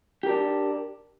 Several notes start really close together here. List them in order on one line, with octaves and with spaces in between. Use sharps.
G4 A#4 D4